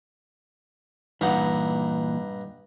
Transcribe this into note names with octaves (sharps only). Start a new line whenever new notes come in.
G2 A#2 E3 D#4 F#5